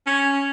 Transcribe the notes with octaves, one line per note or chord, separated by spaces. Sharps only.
C#4